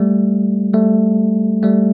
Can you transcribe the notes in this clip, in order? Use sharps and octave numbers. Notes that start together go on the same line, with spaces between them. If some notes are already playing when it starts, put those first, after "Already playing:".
Already playing: G3 A3
G3 A3
G3 A3